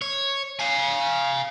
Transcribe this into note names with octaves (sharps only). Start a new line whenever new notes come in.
C#5
F5 G#5